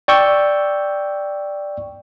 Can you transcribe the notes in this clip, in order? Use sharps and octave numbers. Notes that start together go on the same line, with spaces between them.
D5 G5 C#6 E6 G6